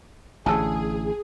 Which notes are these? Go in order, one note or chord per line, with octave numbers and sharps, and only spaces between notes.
A1 A2 D3 G#4 G#5 A5 E6